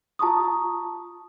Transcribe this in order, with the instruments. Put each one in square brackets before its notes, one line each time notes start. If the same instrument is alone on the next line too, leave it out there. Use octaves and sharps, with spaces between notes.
[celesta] F4 A5 A#5 C#6 D#6